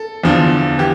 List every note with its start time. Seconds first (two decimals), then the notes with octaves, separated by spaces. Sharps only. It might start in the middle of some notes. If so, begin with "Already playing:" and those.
Already playing: A4
0.24 E2 D3 F3
0.78 E3 G4